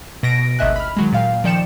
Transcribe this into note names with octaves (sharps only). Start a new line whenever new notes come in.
B2 A#6 D7
G#1 D2 D#5 E5 G#5 F#6
B5 F6
D#3 F#3 G#3
A#2 F5 G5
D#3 F3 D5 G5 C#7 E7